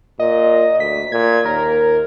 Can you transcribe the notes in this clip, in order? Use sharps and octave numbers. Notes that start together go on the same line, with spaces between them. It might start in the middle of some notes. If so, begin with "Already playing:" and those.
A#2 D#5
D2 B6
A#2 G#6
D#2 A#4